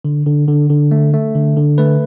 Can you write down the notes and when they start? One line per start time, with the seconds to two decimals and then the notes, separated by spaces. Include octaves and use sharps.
0.04 D3
0.26 D3
0.48 D3
0.70 D3
0.91 A3
1.14 A3
1.35 D3
1.57 D3
1.78 A3 B4